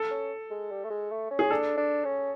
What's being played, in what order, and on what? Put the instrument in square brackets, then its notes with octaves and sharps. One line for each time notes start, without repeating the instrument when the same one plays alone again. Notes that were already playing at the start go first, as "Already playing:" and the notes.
Already playing: [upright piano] A4
[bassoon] C#4
G#3
G3
A3
G#3
A3
C#4
[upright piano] G#4
[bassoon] D4 [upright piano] A4
[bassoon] D4
C#4